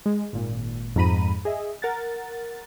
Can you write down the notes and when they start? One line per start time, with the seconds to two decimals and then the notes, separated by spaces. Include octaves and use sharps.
0.06 G#3
0.33 G#1 A#2
0.96 F2 G#2 A#5 B5 D#7
1.45 G#4 D#5 E5
1.82 A#4 F#5 A6